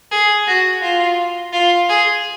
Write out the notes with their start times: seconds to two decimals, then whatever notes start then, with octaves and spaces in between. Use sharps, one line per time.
0.12 G#4
0.48 F#4
0.82 F4
1.53 F4
1.89 G#4